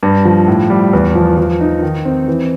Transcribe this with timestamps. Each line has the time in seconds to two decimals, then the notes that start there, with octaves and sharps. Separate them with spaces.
0.03 G2
0.25 F3
0.48 A2
0.70 G3
0.93 E2
1.15 F3
1.38 F3
1.61 D#4
1.83 D#3
2.05 C4
2.28 E3